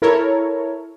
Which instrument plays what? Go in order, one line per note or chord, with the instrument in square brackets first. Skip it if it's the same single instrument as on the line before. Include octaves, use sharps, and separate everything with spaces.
[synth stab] E4 A4 A#4 C#5